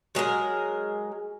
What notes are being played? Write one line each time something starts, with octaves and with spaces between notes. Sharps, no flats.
F#3 G#3 G#4 A#4